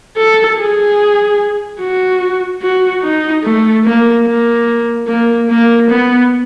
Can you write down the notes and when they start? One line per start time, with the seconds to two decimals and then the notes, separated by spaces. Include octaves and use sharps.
0.17 A4
0.58 G#4
1.80 F#4
2.62 F#4
3.03 D#4
3.44 A3
3.85 A#3
4.26 A#3
5.08 A#3
5.50 A#3
5.90 B3